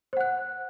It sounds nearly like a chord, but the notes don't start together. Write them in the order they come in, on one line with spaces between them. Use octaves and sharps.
C5 F#5 F#6